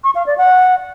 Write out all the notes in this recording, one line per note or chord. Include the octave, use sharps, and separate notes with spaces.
C#6
F5
D5
F#5